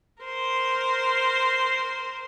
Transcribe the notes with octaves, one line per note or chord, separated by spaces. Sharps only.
A#4 C5